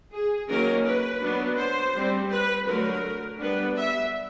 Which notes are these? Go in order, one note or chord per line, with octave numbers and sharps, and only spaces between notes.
G#4
D#3 F#3 A#3 C#4 A#4
B4
F#3 B3 D4
C5
G3 C4
B4
D3 F#3 A3 A#4
G3 B3 D4 B4
E5